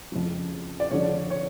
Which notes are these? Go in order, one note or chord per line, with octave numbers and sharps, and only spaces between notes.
F2 C#3 F3
D5
F2 D3 F3 C#5
C#5